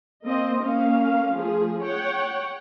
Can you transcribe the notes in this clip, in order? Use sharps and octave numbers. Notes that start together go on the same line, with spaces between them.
A#3 C4 D#5
A#3 C#4 F5
F3 A3 G#4
C#5 F#5 G5